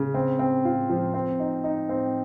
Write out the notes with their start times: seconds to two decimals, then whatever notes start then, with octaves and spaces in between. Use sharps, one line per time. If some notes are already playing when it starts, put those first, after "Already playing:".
Already playing: C#3
0.14 C4
0.39 C4
0.65 F4
0.90 F3
1.14 C4
1.40 D#4
1.64 D#4
1.89 C4